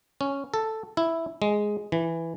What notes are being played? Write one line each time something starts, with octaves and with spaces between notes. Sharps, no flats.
C#4
A4
E4
G#3
E3